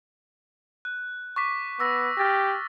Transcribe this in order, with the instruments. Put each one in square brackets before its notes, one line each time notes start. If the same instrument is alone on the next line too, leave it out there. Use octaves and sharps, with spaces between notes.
[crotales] F#6
C#6 D6 B6
[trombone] B3 [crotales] C#6 E6 A#6
[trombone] G4 [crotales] F6 A6 A#6